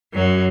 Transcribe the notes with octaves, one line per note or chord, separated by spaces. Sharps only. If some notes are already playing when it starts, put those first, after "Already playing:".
F#2 F#3